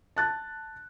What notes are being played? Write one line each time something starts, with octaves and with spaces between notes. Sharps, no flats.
A5 F#6 A6